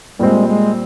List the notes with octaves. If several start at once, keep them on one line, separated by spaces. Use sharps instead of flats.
A#2 G3 G#3 C4
G#3